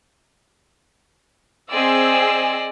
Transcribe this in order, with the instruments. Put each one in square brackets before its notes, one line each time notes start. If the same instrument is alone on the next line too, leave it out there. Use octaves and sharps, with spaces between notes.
[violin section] C4 G#4 E6 [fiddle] D5 D#5